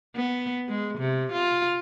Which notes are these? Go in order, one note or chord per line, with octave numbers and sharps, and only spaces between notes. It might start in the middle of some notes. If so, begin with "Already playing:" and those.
B3
G#3
C3
F4